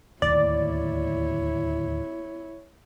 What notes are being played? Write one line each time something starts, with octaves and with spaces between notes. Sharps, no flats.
D1 G#1 D#2 E4 C#5 D5